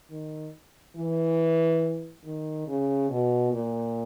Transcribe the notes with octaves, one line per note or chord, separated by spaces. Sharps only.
D#3
E3
D#3
C#3
B2
A#2